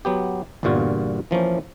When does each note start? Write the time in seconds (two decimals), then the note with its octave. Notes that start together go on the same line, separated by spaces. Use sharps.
0.05 F#3 B3 G4
0.63 G1 E2 G2 A#2 F4 F#4
1.31 E3 F3 A#3 C#4